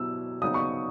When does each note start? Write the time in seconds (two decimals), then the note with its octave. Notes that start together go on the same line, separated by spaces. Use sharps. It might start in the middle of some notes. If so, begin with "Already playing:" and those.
Already playing: B2 F#3 B3 E4 G4 E6
0.42 C#3 F#3 B3 D#4 D#6
0.54 C#6